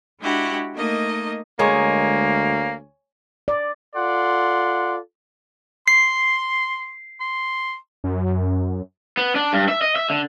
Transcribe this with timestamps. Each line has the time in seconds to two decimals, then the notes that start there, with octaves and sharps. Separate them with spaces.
0.21 G#3 D4 E4 F#4 G4
0.75 A3 A#3 D#4 D#5
1.59 D2 G#3 A#3 A#4 C#5 G#5 C#6
3.48 D5
3.95 F4 A4 D5 F#5 C6
5.88 C6 C7
7.20 C6
8.04 F#2
9.17 B3
9.35 D4
9.53 G2
9.69 E5
9.82 D#5
9.96 E5
10.10 D3